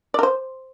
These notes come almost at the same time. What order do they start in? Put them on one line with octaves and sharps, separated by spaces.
D5 A#4 C5